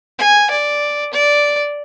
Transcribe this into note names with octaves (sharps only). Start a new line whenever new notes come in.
G#5
D5
D5